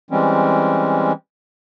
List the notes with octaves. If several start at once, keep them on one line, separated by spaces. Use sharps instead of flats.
E3 G3 G#3 C4 C#4